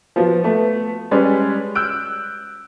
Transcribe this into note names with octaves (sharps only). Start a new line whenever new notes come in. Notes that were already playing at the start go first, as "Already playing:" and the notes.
F3 B3 F#4
A3 B3
G3 G#3 C#4 B4 D5
E6 F#6 G6 D7